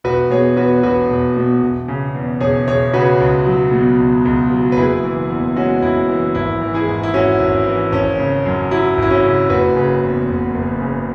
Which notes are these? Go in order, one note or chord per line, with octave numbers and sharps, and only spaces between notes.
E1 F#4 B4
B2 G#4 C#5
E2 F#4 B4
E1 F#4 B4
E1
B2
E1
C#3
E2
E1 G#4 C#5
E1 G#4 C#5
C#3 F#4 B4
C#2
F#3
B2
C#2
C#2
F#3
B4
F#1 E4 G#4
E3
E2
G#3 C#4 F#4
F#1 E4
E3
G#1 E4
E3
E4 G#4
G#2
E4
G#1 C#4 F#4
G#1
E3
G#1 C#4
C#3
F#2
F#3 E4
G#1 E4
C#4 F#4
C#3
F#1 F#4 B4
C#3
E2
F#1
F#1
C#3